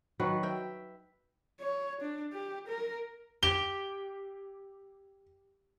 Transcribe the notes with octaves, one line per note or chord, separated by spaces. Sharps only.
D#3 F#3 B4
E5 G5
C#5
D4
G4
A#4
G4 G7